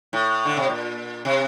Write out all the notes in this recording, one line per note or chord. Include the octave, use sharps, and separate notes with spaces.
A2
D3
C3
A#2
C3